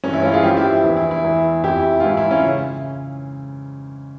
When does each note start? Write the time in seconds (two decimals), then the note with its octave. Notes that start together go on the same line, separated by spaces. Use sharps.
0.04 G2 E3 C#4
0.14 E4
0.23 C#4 F4
0.33 F4 G#4
0.43 G2 F3 E4 G4
0.57 E4 G4
0.70 E4
0.84 E2 E3
0.97 E4
1.11 E4
1.24 E2 E3
1.63 F2 E3 E4 G4
2.00 F4
2.04 G#2 E3 E4
2.17 E4
2.30 C#4 F4
2.45 C#3